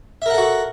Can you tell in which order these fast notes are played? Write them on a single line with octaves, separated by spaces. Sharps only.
E5 A#4 F#5 A4 F#4